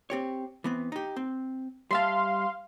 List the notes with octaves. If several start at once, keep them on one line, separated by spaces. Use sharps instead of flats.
C4 G4 C#5
E3 B3 C4
D#4 G4
C4
G3 E5 F5 A5 C6